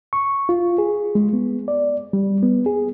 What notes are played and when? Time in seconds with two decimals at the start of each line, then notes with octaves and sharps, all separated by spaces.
0.13 C#6
0.49 F4
0.78 G#4
1.15 G#3
1.33 B3
1.68 D5
2.13 G3
2.43 B3
2.66 G#4